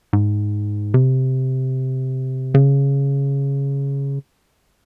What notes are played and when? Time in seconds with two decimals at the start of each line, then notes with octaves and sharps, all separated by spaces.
0.13 G#2
0.94 C3
2.55 C#3